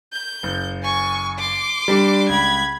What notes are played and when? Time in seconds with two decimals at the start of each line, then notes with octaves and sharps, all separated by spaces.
0.12 G6
0.43 F#1
0.83 G#5 C#6
1.38 C6 D6
1.88 G3 D4
2.29 C#2 B5 G#6